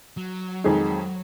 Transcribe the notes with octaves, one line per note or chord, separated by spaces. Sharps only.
F#3
F2 D#3 G#3 D#4 G#4